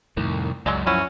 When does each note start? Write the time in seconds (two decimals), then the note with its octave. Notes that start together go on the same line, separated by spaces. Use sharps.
0.17 C2 F2 A2 D#3
0.66 C#2 F#2 F#3 G#3 D5
0.87 F3 C#4 E4 F#4